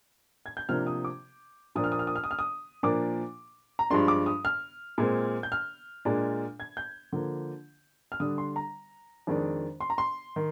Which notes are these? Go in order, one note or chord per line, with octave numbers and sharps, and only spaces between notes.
G#6
G6
C3 F3 A#3 D4 F6
D#6
D6
A#2 F3 A#3 D4 D#6
F6
D#6
F6
D#6
F6
D#6
F6
D#6
A#2 F3 A#3 D4 D6
A#5
G2 F3 G#3 D4 C6
D6
D#6
F6
A#2 G#3 C4
G6
F6
A#2 G#3 D4
G#6
G6
D3 F3 A#3
F6
D3 G3 D4 D#6
C6
A#5
F2 D#3 G#3 D4
C6
A#5
C6
D#3